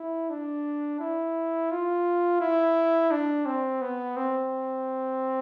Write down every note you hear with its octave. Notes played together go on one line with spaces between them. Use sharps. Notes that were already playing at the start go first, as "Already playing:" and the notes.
Already playing: E4
D4
E4
F4
E4
D4
C4
B3
C4